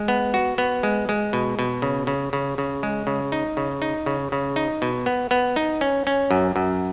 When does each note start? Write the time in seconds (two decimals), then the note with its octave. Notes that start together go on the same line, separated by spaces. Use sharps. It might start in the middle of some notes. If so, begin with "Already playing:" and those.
Already playing: G#3
0.08 B3
0.34 F#4
0.58 B3
0.83 G#3
1.09 G#3
1.33 B2
1.59 B2
1.82 C#3
2.07 C#3
2.33 C#3
2.58 C#3
2.83 G#3
3.07 C#3
3.32 D#4
3.57 C#3
3.82 D#4
4.06 C#3
4.32 C#3
4.56 D#4
4.82 B2
5.06 B3
5.31 B3
5.56 D#4
5.81 C#4
6.07 C#4
6.31 F#2
6.56 F#2